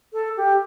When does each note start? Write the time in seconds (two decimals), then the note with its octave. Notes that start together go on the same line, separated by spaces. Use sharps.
0.13 A4
0.37 G4